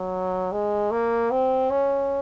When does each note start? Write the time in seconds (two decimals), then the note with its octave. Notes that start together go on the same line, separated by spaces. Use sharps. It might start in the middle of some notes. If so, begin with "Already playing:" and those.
Already playing: F#3
0.52 G#3
0.91 A#3
1.31 C4
1.70 C#4